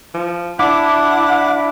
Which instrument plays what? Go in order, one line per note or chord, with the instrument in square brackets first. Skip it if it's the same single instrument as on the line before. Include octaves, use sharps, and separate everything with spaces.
[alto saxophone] F3
[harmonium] D4 [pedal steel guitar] E4 [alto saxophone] F#5 [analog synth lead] D6